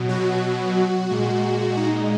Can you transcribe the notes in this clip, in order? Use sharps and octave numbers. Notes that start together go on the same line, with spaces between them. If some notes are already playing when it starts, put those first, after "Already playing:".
Already playing: B2 F#3
F#4
A#2 G#3
D#4